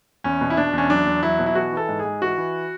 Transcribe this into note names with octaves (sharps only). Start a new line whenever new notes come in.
E2 C#4
B2
E4
B2 D4
E2 C#4
F#3 D4
E2
F#3 E4
B2
E4
E3 F#4
E3 A4
G#2
G#4
G#2
E3 F#4
E3